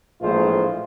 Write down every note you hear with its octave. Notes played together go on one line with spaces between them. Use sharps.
A#1 A2 E3 G#3 F4 C5